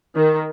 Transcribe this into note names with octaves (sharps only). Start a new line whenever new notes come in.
D#3